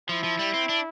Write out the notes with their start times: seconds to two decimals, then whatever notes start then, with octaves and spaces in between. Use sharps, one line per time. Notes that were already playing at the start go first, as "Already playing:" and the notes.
0.09 F3 E4
0.24 F3
0.39 G3
0.54 C4
0.69 D4